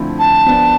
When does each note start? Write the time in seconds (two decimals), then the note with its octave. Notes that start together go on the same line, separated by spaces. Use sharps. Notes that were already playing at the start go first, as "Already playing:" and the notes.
Already playing: D3 F3 A3 C4 E4
0.19 A5
0.46 F3 B3 D4